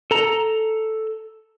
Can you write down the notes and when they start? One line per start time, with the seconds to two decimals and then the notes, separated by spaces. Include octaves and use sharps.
0.11 A4 A#5